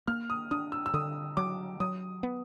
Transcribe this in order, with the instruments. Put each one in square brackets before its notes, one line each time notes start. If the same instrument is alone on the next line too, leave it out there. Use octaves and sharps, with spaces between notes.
[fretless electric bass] A#3 [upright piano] F6
[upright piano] D#6
[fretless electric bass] D4 [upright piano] D#6
[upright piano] E6
E6
[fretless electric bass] D3 [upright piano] D#6
[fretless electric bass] F#3 [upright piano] D6
[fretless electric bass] F#3 [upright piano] D#6
[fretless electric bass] B3